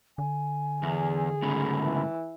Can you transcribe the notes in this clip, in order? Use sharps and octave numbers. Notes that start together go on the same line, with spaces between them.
D3 G#5
E2 G#4
G#2 C#3 A3 B5
E3